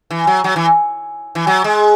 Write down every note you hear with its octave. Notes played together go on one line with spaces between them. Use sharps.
E3
F#3
F#3
E3
E3
F#3
G#3